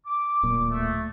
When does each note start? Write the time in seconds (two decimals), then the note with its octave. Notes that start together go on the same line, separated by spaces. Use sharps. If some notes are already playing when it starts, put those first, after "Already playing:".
0.06 D6
0.43 D1 A#2
0.70 A3